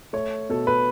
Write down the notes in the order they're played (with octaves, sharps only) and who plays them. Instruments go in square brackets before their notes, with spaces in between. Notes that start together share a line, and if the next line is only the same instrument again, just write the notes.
[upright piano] A3 C#5
B2 A4
B4